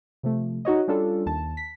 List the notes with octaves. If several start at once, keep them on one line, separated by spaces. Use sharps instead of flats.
C3 F3 A3
D#4 F#4 C#5 D#5
G3 C#4 D4 F4 A4
D#2 A5
B6